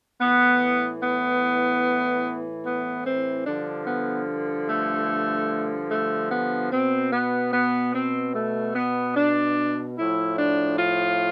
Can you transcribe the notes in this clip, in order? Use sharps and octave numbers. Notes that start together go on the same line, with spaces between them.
A2 E3 B3
B3
B3
C4
G2 D3 F3 D4
B3
A3
A3
B3
B2 C4
B3
B3
C4
A3
B3
D4
A2 F3 E4
D4
F4